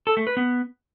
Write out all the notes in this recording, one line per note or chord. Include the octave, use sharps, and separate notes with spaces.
A4
A3
B4
B3